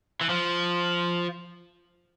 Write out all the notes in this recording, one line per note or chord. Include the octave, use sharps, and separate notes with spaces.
E3
F3